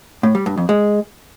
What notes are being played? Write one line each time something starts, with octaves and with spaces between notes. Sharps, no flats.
A2
G3
G2
F2
G#3